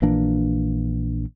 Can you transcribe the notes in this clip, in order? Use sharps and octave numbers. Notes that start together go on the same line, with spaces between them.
A#1 E3 A#3 D4